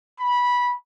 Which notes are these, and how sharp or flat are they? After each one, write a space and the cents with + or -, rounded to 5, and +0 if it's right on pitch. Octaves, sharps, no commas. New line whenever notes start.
B5 -15